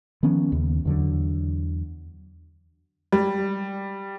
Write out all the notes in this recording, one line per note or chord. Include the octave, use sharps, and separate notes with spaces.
D#3 F3 B3 C#4
D#2 C#3
E2 D3 F#3
G3